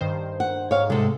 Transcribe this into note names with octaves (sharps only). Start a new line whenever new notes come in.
G2 D#3 C5
F#5
G#2 C#5 F5
G#2 C3 G#3 A4